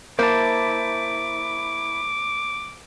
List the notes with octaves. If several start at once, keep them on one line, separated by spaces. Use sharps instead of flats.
A#3 E4 C5 A5 D6